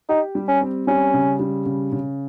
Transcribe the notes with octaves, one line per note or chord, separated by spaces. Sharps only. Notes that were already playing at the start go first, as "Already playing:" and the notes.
D#4 G4
G3
C#4
C4
G3 C#4
C#3
G3
C#3
C#3